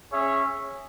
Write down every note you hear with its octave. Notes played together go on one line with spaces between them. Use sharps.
C#4 G#4 C#5 E5